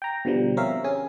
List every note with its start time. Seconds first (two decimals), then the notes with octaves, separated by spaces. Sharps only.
0.02 G5 A#5
0.25 B2 D3 F3 G3
0.57 C4 A#4 C#5 E5 F5
0.84 C#4 G#4 G#5